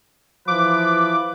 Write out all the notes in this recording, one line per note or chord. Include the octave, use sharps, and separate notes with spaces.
E3 F3 B4 D6